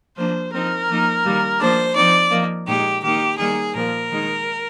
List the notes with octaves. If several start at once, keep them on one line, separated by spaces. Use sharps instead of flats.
F3 A#3 D4 C5
F3 C4 D#4 A#4
F3 A#3 D#4
D#3 G3 A#3
F3 A#3 D4 C5
F3 C4 D#4 D5
F3 A#3 D#4
A#2 G#3 D#4 G4
D#3 A#3 D#4 G4
D#3 G3 A#3 D#4 G#4
A#2 F3 A#3 A#4
D#3 G#3 D#4